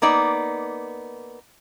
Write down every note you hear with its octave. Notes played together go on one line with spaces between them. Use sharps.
A#3 B3 D#4 D5